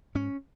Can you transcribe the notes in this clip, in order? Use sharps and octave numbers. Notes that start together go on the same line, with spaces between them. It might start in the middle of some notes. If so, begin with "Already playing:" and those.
G#2 C#4